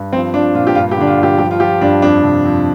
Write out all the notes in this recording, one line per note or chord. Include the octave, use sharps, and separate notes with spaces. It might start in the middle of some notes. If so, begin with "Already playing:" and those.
Already playing: G2
F3 C4
F3 D4
A#2 F4
G4
G2 F4
G4
D3 D4
F4
G2
G4
F3 G4
F4
F3 G4
G2 D4
F2 D4
C3
F2